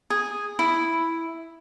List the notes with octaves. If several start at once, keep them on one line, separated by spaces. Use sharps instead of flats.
G#4
E4